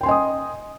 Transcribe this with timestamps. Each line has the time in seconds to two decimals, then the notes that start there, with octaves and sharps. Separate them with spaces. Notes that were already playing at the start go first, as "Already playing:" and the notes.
0.01 G5
0.03 C6
0.06 G#5
0.08 D#5
0.11 D#6